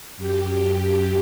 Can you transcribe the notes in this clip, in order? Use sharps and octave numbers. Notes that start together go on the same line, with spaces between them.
F#2 G4